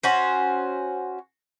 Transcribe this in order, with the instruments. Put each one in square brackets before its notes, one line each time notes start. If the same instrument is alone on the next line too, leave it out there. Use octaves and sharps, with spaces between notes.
[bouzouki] C#4 F#4 C5